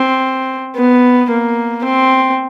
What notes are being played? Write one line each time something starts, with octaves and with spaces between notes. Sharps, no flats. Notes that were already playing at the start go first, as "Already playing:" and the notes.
Already playing: C4
B3
A#3
C4